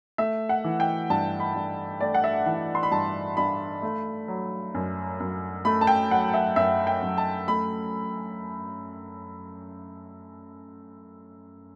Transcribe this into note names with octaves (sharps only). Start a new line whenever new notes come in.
A3 E5
F#5
E3
G5
G2 A5
B5
G2
A3 D5
F#5
E5
E3 F#5
C6
B5
G2 A5
G2 B5
A3
F#3
F#2
F#2
A3 B5
A5
G5
F#3 F#5
E5
F#2 E5
G5
F#2
A5
A3 B5